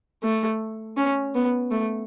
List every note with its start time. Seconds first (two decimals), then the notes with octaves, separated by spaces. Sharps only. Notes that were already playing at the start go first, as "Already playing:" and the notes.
0.23 A3
0.97 C#4
1.35 B3
1.71 A3